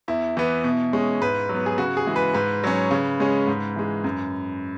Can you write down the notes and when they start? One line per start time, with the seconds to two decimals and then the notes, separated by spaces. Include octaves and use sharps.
0.08 E2 E4
0.37 E3 B3
0.64 B2
0.93 G#3 C#4
1.22 G#2 B4
1.49 F#3
1.54 B3
1.66 G#4
1.78 C#3 F#4
1.97 G#4
2.07 E3 G#3
2.16 B4
2.34 G#2 B4
2.63 F#3 C#4
2.91 C#3
3.20 G#3 C#4
3.47 G#2
3.76 E3 G#3
4.04 F#2